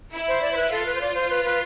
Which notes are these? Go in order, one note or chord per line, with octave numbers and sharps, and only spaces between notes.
E4
C5
D5
C5
B4
F4 A4
B4
C5
D5
C5
B4
B4